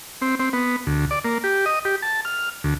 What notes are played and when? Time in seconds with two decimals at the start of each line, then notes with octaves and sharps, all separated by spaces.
0.22 C4
0.40 C4
0.53 B3
0.87 D2
1.11 D5
1.25 A#3
1.44 G4
1.66 D#5
1.85 G4
2.02 A5
2.25 F6
2.64 D2